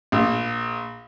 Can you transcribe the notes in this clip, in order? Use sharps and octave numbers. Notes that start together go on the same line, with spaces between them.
A#1